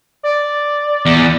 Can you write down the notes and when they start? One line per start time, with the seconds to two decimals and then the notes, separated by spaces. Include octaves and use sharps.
0.23 D5
1.06 E2